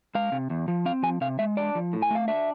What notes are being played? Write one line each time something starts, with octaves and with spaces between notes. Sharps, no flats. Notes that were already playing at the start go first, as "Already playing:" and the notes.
G#3 F5
C3
E2
F3
C4 F5
F3 G#5
C3 F5
G#3 E5
D4 D5
F3
A2
G#5
A3 F5
D4 E5